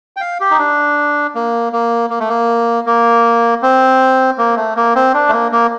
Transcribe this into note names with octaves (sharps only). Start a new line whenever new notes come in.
G5
F5
G4
D#4
D4
A#3
A#3
A#3
A3
A#3
A#3
C4
A#3
A3
A#3
C4
D4
A3
A#3
A#3